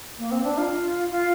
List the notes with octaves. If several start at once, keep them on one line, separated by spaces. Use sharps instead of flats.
A#3
C4
D4
F4
F4